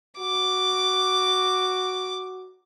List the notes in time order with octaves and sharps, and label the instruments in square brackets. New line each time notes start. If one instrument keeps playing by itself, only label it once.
[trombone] F#4 [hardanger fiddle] D6